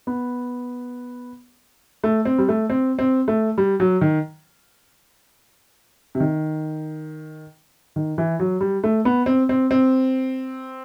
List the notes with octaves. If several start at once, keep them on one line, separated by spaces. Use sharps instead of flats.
B3
A3
C4
G3
A3
C4
C4
A3
G3
F#3
D#3
C3
D#3
D#3
E3
F#3
G3
A3
B3
C4
C4
C4